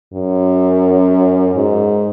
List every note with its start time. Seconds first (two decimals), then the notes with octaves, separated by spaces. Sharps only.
0.13 F#2
1.55 G#2